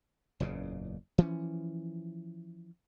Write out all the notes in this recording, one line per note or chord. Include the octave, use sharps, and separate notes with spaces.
F#1 E2 A#2 C#3
E3 F3 C#4